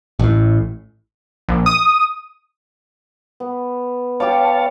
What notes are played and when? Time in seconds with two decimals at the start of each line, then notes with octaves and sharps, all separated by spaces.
0.19 A1 A2
1.48 A#1
1.66 D#6
3.40 B3
4.20 G4 C#5 F5 G5 A5 D6